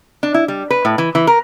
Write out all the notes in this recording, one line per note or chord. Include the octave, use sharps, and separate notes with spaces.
D4
E4
G3
B4
A2
E3
E3
A#4